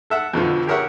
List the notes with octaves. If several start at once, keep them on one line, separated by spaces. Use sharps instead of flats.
A4 E5 F#5
F2 B2 D3 F3
G4 G#4 A#4 C#5 E5 F#5